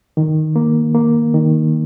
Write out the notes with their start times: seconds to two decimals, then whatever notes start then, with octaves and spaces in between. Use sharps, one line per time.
0.17 D#3
0.56 A#3
0.95 A#3
1.34 D#3